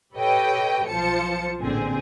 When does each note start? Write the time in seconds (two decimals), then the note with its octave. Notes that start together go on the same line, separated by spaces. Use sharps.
0.15 G4 A4 B4 C#5 D#5 G5
0.88 B1 F3 F4 C5 A5 C#7
1.60 A1 A#2 D3 C4 G#4